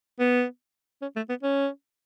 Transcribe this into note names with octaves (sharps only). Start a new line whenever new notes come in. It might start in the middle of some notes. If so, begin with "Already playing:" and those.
B3
C#4
A3
B3
C#4